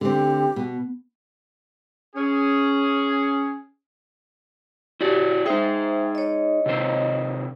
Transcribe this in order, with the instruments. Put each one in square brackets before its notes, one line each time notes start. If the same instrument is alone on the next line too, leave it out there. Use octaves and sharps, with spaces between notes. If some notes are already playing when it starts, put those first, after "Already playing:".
[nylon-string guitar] D3 A3 C4 [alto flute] G4
[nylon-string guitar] B2
[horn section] C#4 G#4
[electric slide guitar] E4 F#4 D5 [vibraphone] G4
[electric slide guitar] D#4 G#4 [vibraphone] C5 E5 G5
[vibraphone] C#5 D#5
[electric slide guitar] C3 D#3 C5